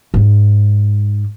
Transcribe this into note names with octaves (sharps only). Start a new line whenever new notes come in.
G#2 G#3